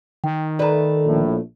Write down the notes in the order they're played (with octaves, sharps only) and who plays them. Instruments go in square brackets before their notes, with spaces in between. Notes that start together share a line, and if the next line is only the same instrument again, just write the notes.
[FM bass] D#3 [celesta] G5
[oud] A3 B4 [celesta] D5 A#5
[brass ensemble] A#1 A2